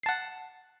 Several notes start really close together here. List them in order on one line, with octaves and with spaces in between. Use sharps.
C7 A5 F#5